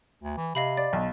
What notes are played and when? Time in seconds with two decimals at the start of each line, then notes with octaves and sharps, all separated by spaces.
0.23 D2
0.37 E3
0.55 C3 D#5 F5 B5
0.77 D5 A6
0.93 B1